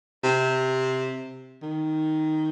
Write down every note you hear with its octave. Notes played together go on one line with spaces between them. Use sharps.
C3
D#3